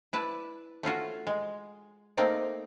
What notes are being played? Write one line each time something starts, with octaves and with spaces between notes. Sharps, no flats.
E4 B4 D5 A5
A3 C#4 F4 F#4
G#3
A3 A#3 C4 D#4 D5